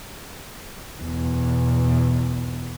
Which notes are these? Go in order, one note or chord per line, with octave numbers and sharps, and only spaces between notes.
E2 B2